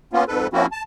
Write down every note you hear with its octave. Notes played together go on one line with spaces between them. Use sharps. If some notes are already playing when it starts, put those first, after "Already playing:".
A#3 B3 C#4 F4
F2 G#2 A4 B4
F3 A#3 C4 C#4 E4 F#4
A5